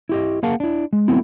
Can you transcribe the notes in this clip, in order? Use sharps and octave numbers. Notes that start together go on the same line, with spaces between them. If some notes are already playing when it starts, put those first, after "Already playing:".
E4 G4 D#5
A#3 G#4 A#4 F5 F#5 A5
D4 E4
G#3
F#3 A3 B3 C4 E4